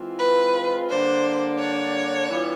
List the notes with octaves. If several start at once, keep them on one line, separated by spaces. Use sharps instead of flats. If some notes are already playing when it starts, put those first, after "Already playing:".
Already playing: E3 G#3 C4 F4
B4
D3 G3 A#3 D4 C5
C#5
E3 G3 B3 D4 F4